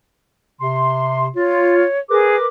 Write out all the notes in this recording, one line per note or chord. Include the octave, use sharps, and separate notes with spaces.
C3 C6
F4 C#5
G#4 A#4 B4 D6